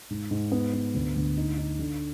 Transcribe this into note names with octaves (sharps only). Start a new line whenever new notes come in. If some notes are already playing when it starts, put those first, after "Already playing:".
G#2
G#2
B3
B3
D2
D2
D#4
D#4
D3